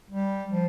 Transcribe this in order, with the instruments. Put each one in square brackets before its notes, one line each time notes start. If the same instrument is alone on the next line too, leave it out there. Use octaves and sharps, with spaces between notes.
[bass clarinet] G3
F3